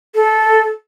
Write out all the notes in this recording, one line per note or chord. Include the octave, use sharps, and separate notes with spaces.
A4